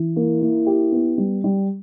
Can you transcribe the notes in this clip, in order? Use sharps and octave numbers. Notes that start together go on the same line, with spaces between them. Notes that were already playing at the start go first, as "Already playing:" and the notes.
Already playing: E3
A#3 E4
A#3
G4
B3
G3
G3